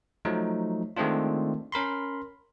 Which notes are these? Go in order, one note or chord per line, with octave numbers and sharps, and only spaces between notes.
F3 F#3 A3 D#4
D#3 G#3 A3 C4 D4 F4
C#4 A#4 B5 C6